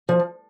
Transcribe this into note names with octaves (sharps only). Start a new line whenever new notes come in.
F3